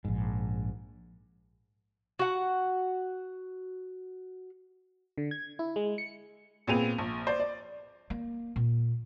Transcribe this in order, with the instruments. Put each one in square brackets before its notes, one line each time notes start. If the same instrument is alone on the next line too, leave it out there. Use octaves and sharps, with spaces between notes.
[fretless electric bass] A#1 G#2
[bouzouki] F#4 F#5
[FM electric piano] D3
G#6
E4
G#3
C#7
[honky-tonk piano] A#2 B3 C4 G#4 D#7 F7
A#1
C5 D5
D5
[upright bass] A#3
A#2